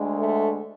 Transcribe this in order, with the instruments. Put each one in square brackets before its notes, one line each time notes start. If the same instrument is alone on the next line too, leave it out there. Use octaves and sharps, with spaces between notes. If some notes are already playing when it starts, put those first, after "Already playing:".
Already playing: [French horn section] D2 D3 G#3
A3